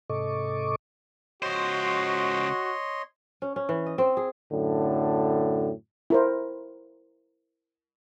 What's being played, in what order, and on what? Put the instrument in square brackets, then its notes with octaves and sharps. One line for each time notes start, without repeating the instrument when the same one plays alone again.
[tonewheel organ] G#2 C3 A4 D#5 C#6 D6
[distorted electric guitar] C#2 C5 [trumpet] F#4 [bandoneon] C#5 D#5 C6
[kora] C#4
C#4
E3
D#5
C4
G#4
[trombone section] F#2 A2 D3
[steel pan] E4 A#4 C5